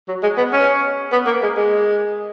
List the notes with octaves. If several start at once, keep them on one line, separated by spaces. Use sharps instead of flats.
F#3
G#3
B3
C#4
B3
A#3
G#3
G#3